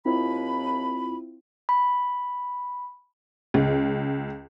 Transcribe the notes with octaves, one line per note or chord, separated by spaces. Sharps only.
D#2 C4 E4 F4 B5
B5
C#2